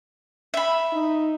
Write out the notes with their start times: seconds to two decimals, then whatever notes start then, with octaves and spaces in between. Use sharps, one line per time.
0.54 E5 B5
0.93 D#4